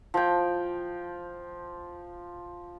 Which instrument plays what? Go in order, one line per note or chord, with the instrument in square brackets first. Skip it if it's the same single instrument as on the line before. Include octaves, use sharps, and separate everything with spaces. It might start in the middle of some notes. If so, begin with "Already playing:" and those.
[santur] F3 G5